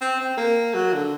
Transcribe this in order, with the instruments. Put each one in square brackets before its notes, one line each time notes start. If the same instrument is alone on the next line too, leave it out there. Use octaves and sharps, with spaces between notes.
[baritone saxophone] C4
C4
A#3
F#3
D3